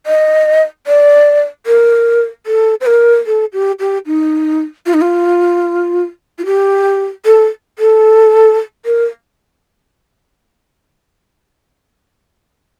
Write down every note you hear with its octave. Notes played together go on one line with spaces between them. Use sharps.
D#5
D5
A#4
A4
C5
A#4
A4
G4
G4
D#4
F4
D#4
F4
F4
G4
A4
A4
A#4